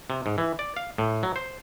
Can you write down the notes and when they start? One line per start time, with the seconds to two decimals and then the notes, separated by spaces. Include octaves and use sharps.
0.10 C3
0.26 G#2
0.38 E3
0.59 D5
0.76 F5
0.98 A2
1.23 F#3
1.36 C5